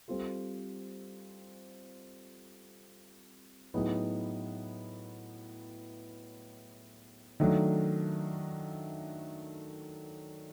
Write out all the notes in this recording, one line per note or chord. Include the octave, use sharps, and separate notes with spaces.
G3 C4 F4 A4
A2 F#3 B3 D#4 G#4
D#3 F#3 A3 D4